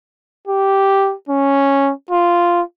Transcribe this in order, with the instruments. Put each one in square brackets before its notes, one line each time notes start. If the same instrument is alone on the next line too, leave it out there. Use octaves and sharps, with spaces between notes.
[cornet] G4
C#4
F4